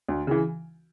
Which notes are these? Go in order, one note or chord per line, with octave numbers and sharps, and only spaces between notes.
D2
C#3 E3